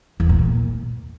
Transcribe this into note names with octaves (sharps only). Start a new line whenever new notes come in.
E2
A2
A#2